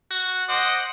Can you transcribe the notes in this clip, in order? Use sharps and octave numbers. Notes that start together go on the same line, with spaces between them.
F#4
C5 D#5 F#5 D6